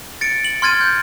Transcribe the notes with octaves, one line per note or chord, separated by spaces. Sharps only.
A6 C#7 D7
F#7
C6 F6 G#6 A6 D#7
G6